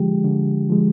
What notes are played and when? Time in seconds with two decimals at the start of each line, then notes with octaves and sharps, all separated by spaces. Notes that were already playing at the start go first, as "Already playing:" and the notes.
Already playing: D3 F3 G#3 G4
0.24 D3
0.70 F3 G#3